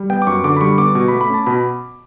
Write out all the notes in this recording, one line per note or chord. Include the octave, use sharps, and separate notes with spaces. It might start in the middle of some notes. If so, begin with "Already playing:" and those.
Already playing: G3
B3 G5
D6
F#2 C#6
D3 D6
B5
G3 C#6
B3 D6
B2 C#6
B5
A3
B5
C#4 A5
B2 B5